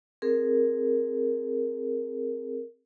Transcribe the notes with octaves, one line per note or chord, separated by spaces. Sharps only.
C4 G#4 A#4